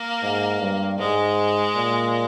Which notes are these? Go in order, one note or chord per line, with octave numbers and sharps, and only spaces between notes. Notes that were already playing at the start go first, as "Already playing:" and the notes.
Already playing: A#3
G#2
G2
G#2 G#3
A#2